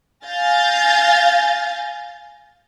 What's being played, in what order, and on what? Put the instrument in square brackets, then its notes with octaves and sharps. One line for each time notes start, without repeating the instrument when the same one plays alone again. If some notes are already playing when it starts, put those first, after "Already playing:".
[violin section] F5 G#5 F6 G6 A6 A#6